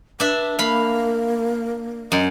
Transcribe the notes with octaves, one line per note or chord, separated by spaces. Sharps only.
D4 B4 E5
A#3 F5 B5
F#2 D#5